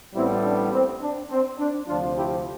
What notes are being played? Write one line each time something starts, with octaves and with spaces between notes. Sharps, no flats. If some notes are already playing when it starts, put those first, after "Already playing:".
A1 A2 G3 B3 C4 E4
D4
C4
D4
C4
D4
D2 C3 F3 D4 F4
E4 G4